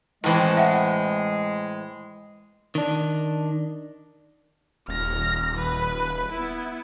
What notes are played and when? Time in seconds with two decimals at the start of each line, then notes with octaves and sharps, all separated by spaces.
0.24 A2 E3 G#3 C4
0.57 E5 F#5
2.75 D#3 D4
4.88 D#1 F6 A#6
5.56 B4
6.32 B3 E4